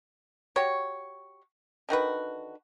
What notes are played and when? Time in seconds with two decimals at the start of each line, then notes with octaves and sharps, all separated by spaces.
0.56 F#4 G4 C#5
1.89 D3 D#3 F#4 B4